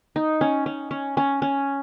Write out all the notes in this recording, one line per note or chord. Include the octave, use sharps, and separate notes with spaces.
D#4
C#4
C#4
C#4
C#4
C#4